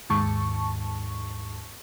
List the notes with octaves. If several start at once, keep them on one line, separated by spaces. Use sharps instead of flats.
D#2 G#2 A5 C#6